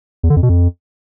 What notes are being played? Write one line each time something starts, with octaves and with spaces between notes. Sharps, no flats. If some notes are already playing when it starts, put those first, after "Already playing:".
E2
D3
F2
B2
F2